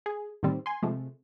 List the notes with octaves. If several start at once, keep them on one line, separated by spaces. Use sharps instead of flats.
G#4
A2 D#3 G3 C4
G#5 C6
C3 F3 G#3 A3